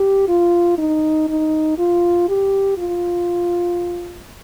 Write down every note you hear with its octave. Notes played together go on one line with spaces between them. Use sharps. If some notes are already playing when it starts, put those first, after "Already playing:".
Already playing: G4
F4
D#4
D#4
F4
G4
F4